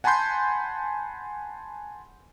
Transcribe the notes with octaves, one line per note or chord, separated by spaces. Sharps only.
F#5 G#5 A5 B5 C6 G6